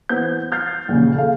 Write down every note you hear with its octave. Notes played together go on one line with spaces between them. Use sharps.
E3 B3 C5 G6
F6 G6 A6 C7
A#1 D#2 A#2 C#3
G#4 A4 F5